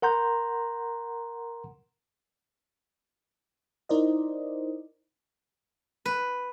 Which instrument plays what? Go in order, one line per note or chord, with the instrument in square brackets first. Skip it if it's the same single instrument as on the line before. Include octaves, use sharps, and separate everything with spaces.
[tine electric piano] A#4 F#5 A#5 C6 G6
[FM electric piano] D#4 E4 A#4 C5 D5 D#5
[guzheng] B4